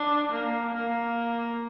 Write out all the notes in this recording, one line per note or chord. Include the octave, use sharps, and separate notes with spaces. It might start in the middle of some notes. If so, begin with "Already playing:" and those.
Already playing: D4
A#3
A#3